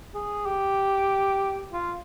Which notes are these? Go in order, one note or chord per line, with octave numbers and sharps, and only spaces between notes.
G#4
G4
F4